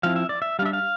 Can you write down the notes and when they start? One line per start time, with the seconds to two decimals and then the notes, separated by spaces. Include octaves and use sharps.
0.03 F3 C4 E4 F5
0.16 E5
0.29 D5
0.42 E5
0.59 G3 F5
0.62 D4 E5
0.73 F5